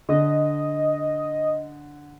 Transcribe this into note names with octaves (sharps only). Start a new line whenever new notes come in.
D3 D#5